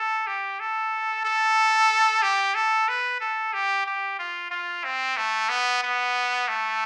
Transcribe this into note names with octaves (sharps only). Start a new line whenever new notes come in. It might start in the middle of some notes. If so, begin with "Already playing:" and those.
Already playing: A4
G4
A4
A4
G4
A4
B4
A4
G4
G4
F4
F4
C4
A3
B3
B3
A3